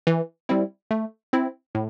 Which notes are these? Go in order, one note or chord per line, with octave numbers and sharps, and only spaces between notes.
E3
G3 C4 E4
A3
C4 E4
A2